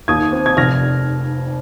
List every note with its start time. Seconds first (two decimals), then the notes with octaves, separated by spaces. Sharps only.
0.08 D#2 D#6 G#6
0.32 C4
0.46 G#6
0.57 F1 F6 A#6